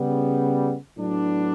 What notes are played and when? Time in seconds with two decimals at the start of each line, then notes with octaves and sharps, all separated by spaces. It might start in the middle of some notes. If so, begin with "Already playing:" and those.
Already playing: C#3 G3 B3
0.96 A2 F#3 B3 D4